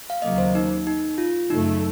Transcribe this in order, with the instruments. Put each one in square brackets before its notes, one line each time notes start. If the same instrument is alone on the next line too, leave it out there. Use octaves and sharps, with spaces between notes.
[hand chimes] F5
[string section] D#2 C#3 F#3 A#3 [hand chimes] D#5
[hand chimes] C5
D#4
D#4
F4
[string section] F#2 C#3 F#3 A3 [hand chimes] D#4